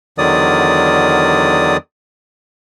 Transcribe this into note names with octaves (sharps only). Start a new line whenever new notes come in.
E2 D3 D#3 F#3 D5 D#6